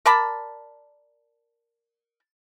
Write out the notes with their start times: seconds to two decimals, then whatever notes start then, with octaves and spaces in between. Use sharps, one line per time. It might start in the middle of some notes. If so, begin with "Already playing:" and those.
0.06 A#4 D5 A5 B5